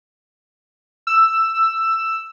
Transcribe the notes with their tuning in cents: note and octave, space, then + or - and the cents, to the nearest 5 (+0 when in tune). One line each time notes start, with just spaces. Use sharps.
E6 +10